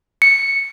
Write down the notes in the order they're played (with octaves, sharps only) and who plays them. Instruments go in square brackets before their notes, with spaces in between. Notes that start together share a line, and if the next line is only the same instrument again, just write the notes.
[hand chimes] C#7